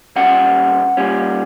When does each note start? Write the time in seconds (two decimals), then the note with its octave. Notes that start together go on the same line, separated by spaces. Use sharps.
0.16 A#2 G3 C#4 F#5
0.97 A#2 G3 C#4